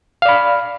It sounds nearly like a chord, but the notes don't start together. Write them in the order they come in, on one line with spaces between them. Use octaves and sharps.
F5 D5 B5